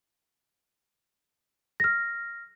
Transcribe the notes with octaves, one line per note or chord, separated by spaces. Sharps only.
F6 A#6